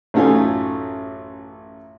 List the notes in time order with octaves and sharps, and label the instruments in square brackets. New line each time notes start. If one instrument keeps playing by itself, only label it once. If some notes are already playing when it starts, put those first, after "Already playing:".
[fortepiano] A1 F#2 A3 D#4 F4 G#5